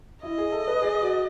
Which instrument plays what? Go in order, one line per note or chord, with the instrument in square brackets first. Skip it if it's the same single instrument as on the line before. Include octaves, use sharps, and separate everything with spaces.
[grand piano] E4 [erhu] D#5
[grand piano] G#4
A4
B4
G#4
F#4